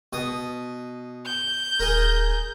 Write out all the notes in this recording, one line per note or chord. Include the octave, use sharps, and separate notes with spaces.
B2 D#6
G6
D#1 G#4 A#4